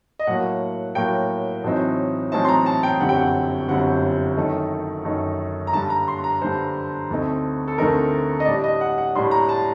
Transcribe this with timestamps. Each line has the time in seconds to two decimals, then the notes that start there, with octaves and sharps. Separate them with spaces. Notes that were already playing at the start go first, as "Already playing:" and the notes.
0.19 D#5
0.27 A2 F#3 A#3 F#5
0.95 A2 F#3 A#3 G5
1.64 A1 A2 F#3 C4 D#4
2.32 A1 A2 F#3 C4 D#4 A5
2.45 C6
2.48 A#5
2.66 A5
2.83 G5
3.00 G1 F#2 D3 G3 C4 F#5
3.09 G5
3.17 F#5
3.68 G1 F#2 D3 G3 C4 F#5
4.37 F#2 D#3 A3 D#4
5.05 F#2 D#3 A3 D#4
5.67 A#5
5.73 G2 D3 G3 A5
5.90 A#5
6.08 C6
6.24 A#5
6.41 G2 D3 G3 C5
7.10 D2 D3 A3 C4 D#4
7.68 A4
7.78 D2 D3 A3 C4 D#4 A#4
8.40 D#5
8.46 A2 G3 D4 D5
8.64 D#5
8.81 F#5
8.98 F#5
9.15 A2 G3 D4 C6
9.31 A#5
9.49 A5